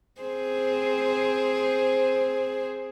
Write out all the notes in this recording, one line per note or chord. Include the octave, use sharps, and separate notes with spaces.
C4 G#4 C5